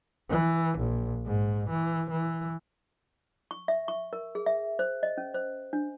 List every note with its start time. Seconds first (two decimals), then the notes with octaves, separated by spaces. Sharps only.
0.30 E3
0.79 A#1
1.26 G#2
1.69 E3
2.10 E3
3.51 C#6
3.68 E5
3.88 C#6
4.13 A#4
4.35 G#4
4.46 E5
4.79 C5
5.03 D#5
5.17 C#4
5.34 C5
5.73 D4